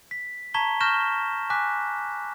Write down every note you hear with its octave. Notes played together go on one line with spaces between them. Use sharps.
B6
A5 A#5 C#6 G#6 B6 G7
C#6 F6 G6 A#6 E7
G#5 D6 F#6 B6